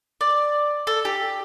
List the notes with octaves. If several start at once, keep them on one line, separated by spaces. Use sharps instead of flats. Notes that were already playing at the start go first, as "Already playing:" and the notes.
D5
A4
G4